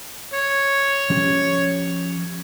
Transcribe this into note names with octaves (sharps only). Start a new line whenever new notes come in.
C#5
F3 C#4 G4